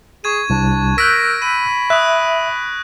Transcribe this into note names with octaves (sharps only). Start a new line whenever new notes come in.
G#4 C#6 G#6 D#7
C2 D4
A#4 E6 F#6 G6 A#6 B6 D7
B5 D#7
E5 D#6 F#6